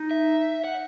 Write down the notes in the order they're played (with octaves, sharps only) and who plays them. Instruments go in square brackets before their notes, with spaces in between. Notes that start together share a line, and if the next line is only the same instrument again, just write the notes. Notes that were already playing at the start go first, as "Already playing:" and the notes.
Already playing: [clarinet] D#4
[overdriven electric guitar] E5
F#5